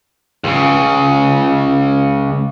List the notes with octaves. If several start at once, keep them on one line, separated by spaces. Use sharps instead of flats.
C#2 C#3